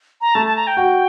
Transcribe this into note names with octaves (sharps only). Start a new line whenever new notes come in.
A#5
A3 A5
A5
A#5
G5
F#4